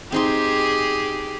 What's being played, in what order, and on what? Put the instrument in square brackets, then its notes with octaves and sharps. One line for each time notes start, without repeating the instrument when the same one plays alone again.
[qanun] C4 D#4 C6 [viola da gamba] G4 G#4